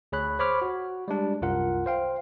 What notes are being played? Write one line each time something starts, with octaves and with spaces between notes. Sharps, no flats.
D2 G#4 C#5 B5 F#6
C5 C#5 B5 D6 F6
F#4
G3 G#3 D4
C2 F#2 F4 A#4 F#5
C5 F5 G5